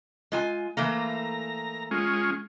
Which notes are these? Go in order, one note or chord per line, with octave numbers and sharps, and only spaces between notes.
G#3 F4 G#5
E3 A3 A#3 A#5
G#3 C#4 F4